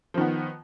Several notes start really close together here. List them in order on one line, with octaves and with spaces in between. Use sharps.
F3 D#3 B3